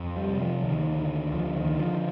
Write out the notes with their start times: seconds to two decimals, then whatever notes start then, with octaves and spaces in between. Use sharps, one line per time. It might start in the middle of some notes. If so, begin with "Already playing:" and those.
Already playing: F2
0.17 G3
0.29 C3
0.40 F3
0.63 D2 D#3
0.98 D3
1.33 D2 F3
1.57 D#3
1.68 D3
1.79 F3